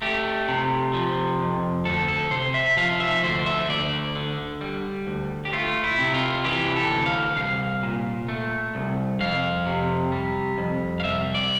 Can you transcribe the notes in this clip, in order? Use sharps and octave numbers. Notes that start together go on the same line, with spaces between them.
A3 G4
C3
F3
F2
D2 A4
A4
C3 C5
E5
F3 F5
E5
D2 C5
E5
D2 D5
D3
G3
D2
G4
A3 F4
E4
C3
F4
E3 G4
A4
D2
F5
C2 F5
A#2
A3
C2
F2 F5
C3
G3
F2
F5
C2 E5
D5